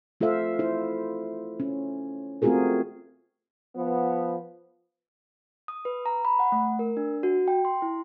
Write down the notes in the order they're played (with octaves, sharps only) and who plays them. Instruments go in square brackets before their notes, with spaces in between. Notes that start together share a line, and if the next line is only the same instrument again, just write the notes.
[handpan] A3 F4 A4 C5 E5 F5
E4 C5
C#4
A3 C4 F4 F#4 G#4 A#4
[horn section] F3 B3
[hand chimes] D#6
B4
A#5
B5
F#5
A3
A#4
D4
F#4
G5
C6
E4